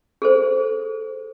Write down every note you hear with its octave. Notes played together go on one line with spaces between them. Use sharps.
G#4 A4 C5